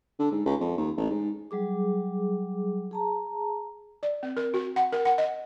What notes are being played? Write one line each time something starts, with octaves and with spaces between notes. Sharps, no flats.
D3
G#2
C#2
F2
D#2
A1
G#2
F#3 G3 G#4 D6
G#4 A5 A#5
D5
C4
A#4
F#4
F#5
A#4
F#5
D#5